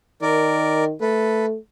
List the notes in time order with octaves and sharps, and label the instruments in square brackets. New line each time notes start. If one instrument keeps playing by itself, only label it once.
[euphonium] D#3 [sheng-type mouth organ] A#4 D5
[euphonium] A3 [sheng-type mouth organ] A4 B4